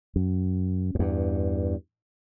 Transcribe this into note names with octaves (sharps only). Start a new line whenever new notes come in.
F#2
F#2
E2 G2